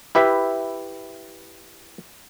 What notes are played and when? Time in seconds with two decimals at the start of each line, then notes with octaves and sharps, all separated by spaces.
0.15 E4 G4 B4 E5